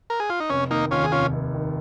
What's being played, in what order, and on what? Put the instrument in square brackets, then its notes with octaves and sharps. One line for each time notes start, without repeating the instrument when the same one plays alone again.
[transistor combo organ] A#4
G#4
F4
D#4
[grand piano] F1 [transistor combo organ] C#4
[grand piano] D#3 [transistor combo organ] A#3 D#4
[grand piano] D#2 [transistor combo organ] C#4 F4
[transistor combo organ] G#4
[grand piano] F1 [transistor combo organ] C#4 F4
[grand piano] F1
D#3